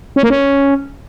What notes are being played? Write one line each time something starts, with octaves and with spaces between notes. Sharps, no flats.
C#4
A#3
C#4